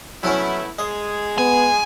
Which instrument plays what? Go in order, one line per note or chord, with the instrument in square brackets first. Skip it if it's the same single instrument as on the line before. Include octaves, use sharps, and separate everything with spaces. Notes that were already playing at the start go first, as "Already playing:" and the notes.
[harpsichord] F#3 C#4 [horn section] A3 B3 E4
[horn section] G#3 G#4 [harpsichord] D#5
[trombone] B3 [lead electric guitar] G#5